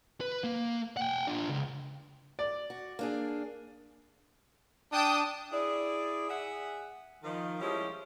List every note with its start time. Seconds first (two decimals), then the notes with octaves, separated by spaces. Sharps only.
0.21 B4
0.44 A#3
0.97 F#5 G5
1.27 D4 F4
1.48 C#2
2.39 D5
2.70 F#4
2.99 A#3 D4 G#4
4.93 D4 G5 A5 D#6
5.52 E4 G#4 D5
6.29 G#4 E5 F#5
7.24 D#3 F3
7.60 F3 G3 G#3 C#4 E4 G4